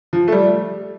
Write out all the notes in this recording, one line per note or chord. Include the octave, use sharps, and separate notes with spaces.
F3
A3
G3